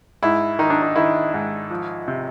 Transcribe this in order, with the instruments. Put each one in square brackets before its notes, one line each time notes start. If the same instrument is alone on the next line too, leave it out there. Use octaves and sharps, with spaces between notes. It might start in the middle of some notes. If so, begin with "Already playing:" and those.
[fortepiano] G#2 E4
D#3 D#4
D4
D#4
D#3 E4
G#2
F3
C3